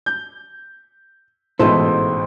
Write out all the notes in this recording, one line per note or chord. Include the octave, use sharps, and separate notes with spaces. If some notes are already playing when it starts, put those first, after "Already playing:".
G6
A1 G#2 B2 E4 A4 C5 D#5